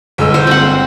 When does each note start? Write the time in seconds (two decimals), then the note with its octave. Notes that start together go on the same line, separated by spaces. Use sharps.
0.18 G1 G#3 E6
0.34 C5
0.47 C4 F#5